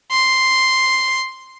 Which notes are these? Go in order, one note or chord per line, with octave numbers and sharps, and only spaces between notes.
C6